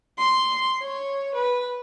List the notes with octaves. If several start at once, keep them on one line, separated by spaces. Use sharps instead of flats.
C6
C#5
B4